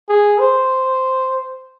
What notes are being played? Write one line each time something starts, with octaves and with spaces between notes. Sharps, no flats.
G#4
C5